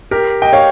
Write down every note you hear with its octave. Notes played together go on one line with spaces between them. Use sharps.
G4 A#4
D#5 G5
C#5 F5